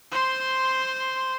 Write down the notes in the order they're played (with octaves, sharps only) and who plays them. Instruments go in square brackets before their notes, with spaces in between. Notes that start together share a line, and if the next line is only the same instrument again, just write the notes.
[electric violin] C5 C6